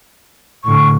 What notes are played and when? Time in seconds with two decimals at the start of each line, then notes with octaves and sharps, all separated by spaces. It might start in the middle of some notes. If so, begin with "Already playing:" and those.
0.64 A2 D3 C#6